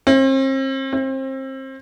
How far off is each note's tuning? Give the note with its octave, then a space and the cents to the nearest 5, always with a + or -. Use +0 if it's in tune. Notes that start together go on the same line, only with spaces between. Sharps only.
C4 +40
C4 +30